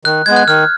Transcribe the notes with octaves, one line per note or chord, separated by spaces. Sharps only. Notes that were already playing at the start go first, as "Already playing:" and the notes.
D#3 F#6
G#3 B3 G#6
F#6
D#3 F6